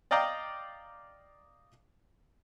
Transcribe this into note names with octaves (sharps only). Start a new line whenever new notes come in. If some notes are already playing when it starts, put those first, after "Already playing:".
D5 D#5 F5 G5 A#5